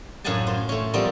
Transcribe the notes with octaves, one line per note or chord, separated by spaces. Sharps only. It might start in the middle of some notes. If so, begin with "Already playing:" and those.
F#2 A2 F5 F#5 G#5 A5
F4 C5
A3 C#4
F3 G3 B3 C4 A4 A#4